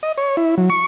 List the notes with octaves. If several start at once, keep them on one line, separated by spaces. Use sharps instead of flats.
D#5
C#5
E4
F#3
C#6